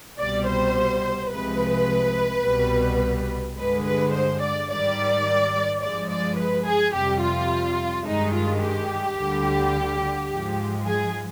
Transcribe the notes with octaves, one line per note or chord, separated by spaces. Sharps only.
C2 B2 G3 D5
C5
C2 C3 F3 G#3 B4
C2 B2 G3
G2 D3 G#3 B4
B4
C5
D5
G#2 D#3 G3 D5
G2 F3 G#3 D5
D5
B4
G#4
F2 C3 G3 G4
F4
G2 D#3 G#3 D#4
F4
G4
D2 D3 G3
G#2 F3 G#3
G#4